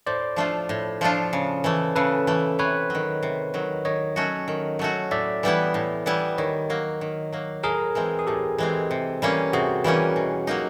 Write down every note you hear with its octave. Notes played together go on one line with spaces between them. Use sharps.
A2 C5 D5
F3 A3 D4 F4
A2
F3 A3 D4 F4
C#3
E3 A3
C#3 A4 B4
E3 A3
C3 B4 C#5
D#3 F#3
C3
D#3 F#3
D#3 C#5 D#5
F#3 A3 C#4 F#4
D#3
F#3 A3 C#4 F#4
A2 D5 E5
E3 G3 B3 E4
A2
E3 G3 B3 E4
D#3 C#5 D#5
F#3 A#3
D#3
F#3 A#3
A2 G#4 A#4
E3 G#3 C4
G#4
A2 G4 A4
E3 G#3 C4
C3
E3 G3 A#3 C#4
C3 F#4 G#4
E3 G3 A#3 C#4
B2
F#3 A#3 D#4